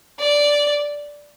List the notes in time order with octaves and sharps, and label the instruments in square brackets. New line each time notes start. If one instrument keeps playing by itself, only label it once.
[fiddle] D5